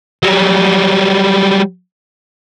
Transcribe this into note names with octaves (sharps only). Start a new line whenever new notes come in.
F#3 G3